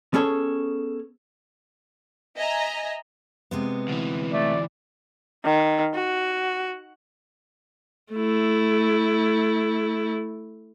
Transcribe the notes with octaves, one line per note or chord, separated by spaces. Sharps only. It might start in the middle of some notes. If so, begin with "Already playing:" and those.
B3 C#4 G#4 A4 C#5
D#5 E5 G#5 A#5
C3 G#3 B3
D2 E3
A3 D5
D#3
F#4
A3 E4